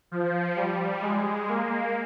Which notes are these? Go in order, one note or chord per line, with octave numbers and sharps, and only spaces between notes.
F3
G3
G#3
A#3